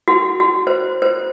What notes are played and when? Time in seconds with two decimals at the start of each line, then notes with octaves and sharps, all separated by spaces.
0.08 F#4
0.40 F#4
0.67 C5
1.02 C5